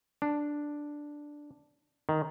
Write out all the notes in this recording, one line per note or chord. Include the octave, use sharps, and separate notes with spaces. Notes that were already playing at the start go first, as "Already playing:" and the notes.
D4
D#3